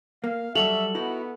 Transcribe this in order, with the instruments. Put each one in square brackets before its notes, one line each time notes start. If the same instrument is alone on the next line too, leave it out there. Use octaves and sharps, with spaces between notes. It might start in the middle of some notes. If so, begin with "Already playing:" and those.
[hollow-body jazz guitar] A#3 [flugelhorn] F5
[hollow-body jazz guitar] F#3 G3 F#4 [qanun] A4 [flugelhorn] E5 [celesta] F7 F#7
[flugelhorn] B3 [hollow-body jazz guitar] D#4 E4 F#4